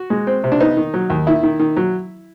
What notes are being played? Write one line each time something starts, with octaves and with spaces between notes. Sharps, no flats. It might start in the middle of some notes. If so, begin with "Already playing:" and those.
Already playing: F#4
G#3
C4
C3
D4
B3 D#4
D#3
F#3
D#2
D#3 E4
D#3
D#3
F#3